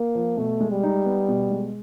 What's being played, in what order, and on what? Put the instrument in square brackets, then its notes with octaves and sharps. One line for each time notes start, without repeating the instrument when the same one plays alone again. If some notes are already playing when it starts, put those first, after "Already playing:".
Already playing: [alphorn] A#3
[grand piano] F3
[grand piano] B2 [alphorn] A3
[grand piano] G#3
[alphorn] G3
[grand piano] D#4
B3
B2
G#3